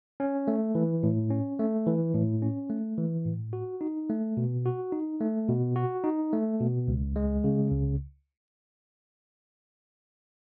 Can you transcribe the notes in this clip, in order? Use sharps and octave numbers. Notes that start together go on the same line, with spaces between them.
C#4
A3
E3
A2
C#4
A3
E3
A2
C#4
A3
E3
A2
F#4
D#4
A3
B2
F#4
D#4
A3
B2
F#4
D#4
A3
B2
C#2
G#3
C#3
C#2